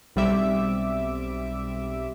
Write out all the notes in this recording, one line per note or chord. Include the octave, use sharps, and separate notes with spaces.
B1 G3 C4 E5 D6